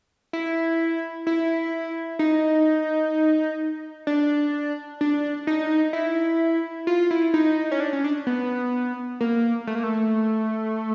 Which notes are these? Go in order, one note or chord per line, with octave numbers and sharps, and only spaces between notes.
E4
E4
D#4
D4
D4
D#4
E4
F4
E4
D#4
C#4
D4
C#4
D4
B3
A#3
A3
A#3
A3